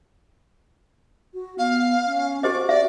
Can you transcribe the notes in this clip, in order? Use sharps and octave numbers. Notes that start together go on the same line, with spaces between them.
F#4
B3 F5
C#4
F#4 G4 C5 D#5 D6
D5 E5